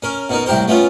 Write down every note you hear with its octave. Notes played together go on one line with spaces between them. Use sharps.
C#4 A#4
B2 D#4 A#4
C2 A2 G4 A#4 C5
A3 B3 C#4 F4